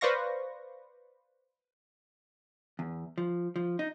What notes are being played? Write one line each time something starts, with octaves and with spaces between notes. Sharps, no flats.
B4 C5 D5 F5 C#6 A#6
E2
F3
F3
D#4